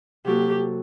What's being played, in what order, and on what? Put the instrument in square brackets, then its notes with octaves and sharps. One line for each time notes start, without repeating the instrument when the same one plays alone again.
[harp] C3 F#3 A#3 F#4 A4 [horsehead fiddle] G4